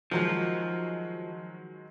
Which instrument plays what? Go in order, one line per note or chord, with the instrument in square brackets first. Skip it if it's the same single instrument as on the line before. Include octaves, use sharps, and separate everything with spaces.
[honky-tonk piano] D#3 F#3 G#3 [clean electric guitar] F3